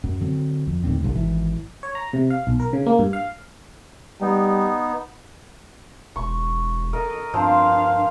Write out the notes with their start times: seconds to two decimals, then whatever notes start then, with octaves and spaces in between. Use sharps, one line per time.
0.04 F#2
0.20 D3 F#3 C4
0.67 F2
0.84 D#2 A2 D3 C4
1.03 G1 C2 D3
1.14 G#1 E3
1.83 C#5
1.95 A#5
2.13 C3
2.30 F5
2.47 B1
2.60 A#4
2.73 C#3
2.86 A#3
2.99 G2
3.13 F5
4.21 G3 B3 D#4
6.16 E1 C#6
6.93 A4 A#4 D#5
7.34 G2 F3 C4 D4 F5